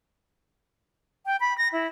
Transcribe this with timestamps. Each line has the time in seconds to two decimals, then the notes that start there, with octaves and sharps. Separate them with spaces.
1.26 G5
1.41 B5
1.58 A#6
1.73 E4